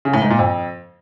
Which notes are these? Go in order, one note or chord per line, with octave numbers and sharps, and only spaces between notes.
C#3
A2
G#2
A#2
F2